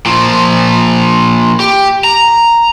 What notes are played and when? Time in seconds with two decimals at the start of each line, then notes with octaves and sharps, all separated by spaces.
0.06 A#2 F3
1.60 G4
2.04 A#5